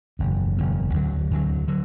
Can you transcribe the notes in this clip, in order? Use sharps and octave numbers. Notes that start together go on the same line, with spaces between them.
F#1 E2 B2
F#1 E2 B2
D2 D3 F#3
D2 D3 F#3
D3 F#3